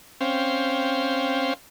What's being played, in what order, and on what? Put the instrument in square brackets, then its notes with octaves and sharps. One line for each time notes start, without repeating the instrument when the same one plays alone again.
[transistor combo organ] C4 C#4 C5 F5 G5